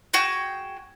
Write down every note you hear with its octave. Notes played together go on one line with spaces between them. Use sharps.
F#4 G#4 G5